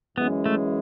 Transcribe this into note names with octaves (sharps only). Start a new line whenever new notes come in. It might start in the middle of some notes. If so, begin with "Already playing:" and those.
F#2 E3 G#3 B3 C#4
A3